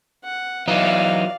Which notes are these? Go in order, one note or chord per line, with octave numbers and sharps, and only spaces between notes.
F#5
E3 F#3 D#4 D5 F5